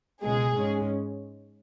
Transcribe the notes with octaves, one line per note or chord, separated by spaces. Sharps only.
C#2 B2 G#3 G#4
G#2 G#3 C#4